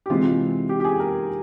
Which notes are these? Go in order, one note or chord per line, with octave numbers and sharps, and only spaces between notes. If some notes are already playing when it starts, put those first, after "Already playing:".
G4
C3 E3 G#3 C4 F4
G4
G4
G#4
A#4